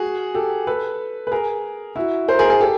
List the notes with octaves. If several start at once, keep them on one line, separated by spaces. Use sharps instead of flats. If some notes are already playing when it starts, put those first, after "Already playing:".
Already playing: F#4 G#4
G4 A4
A4 B4
B4
G#4 A#4
E4 F#4
A#4 C5
G#4 A#4
G#4 A#4
G4 A4